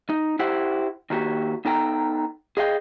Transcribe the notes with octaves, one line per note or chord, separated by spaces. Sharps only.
D#4
E4 G4 C5 F#5
D#3 A#3 F#4 G4
B3 D#4 A4 G5 G#5 A#5
G#4 D#5 F5 G5